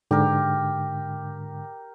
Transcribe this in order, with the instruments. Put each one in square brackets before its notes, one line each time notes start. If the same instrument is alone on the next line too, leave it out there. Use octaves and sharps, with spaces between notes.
[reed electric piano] G#2 D3 [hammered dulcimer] G4 A#4